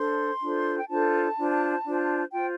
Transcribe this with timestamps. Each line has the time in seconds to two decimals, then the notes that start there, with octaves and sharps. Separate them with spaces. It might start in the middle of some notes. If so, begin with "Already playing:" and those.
Already playing: D4 A4 C5 C6
0.41 D4 F4 A4 C5
0.79 G5
0.89 D4 F4 A4 C5 A5
1.37 D4 F4 C5
1.85 D4 F4 C5
2.33 F4 C5 G5